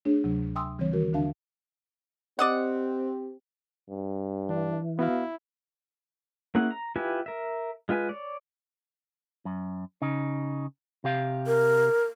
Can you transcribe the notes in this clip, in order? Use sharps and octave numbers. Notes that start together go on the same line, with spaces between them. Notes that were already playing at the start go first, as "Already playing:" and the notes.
A3 D4 G#4 C#5
D2 C3 F#3
E5 G5 G#5 C6 D#6 E6
C#3 E3 G3 C4 C#5
D#3 A3 F#4 A#4
D#2 D3 D4 E5 F5 A5
C4 G4 D5 D#5 F#5
G2
E3 D4
B3 E4 F#4 F5
A#3 C#4 E4 G#4 F#5
A#5
E4 F4 G4 B4 G#5
A#4 E5
G#3 F4 B4 G#5
C#5 D5
F#2
C#3 D#4
C3 G4 F5
A#4